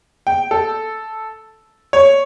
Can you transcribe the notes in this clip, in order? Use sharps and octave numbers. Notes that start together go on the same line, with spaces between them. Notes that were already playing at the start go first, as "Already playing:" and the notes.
G5
A4
C#5